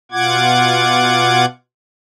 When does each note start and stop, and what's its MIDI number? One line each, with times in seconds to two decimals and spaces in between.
0.12 1.46 47
0.12 1.46 65
0.12 1.46 78
0.12 1.46 86
0.12 1.46 92